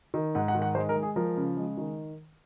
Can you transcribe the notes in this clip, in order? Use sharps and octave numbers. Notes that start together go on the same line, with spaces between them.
D#3
G#2 F#5
F#5
D#3
F#5
G#3 C5
A#4
G#3
G#4
F3 A#4
C#3
G#3
D#3